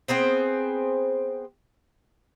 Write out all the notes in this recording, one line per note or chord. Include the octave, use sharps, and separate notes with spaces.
B3 C4 G#4 C5